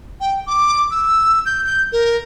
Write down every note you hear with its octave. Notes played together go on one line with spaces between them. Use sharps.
G5
D6
E6
G6
G6
A#4